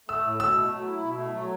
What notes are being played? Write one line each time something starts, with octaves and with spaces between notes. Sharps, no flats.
A3 E6
A2
B2 E6
A3
F#3
E4
B2
A3
F#3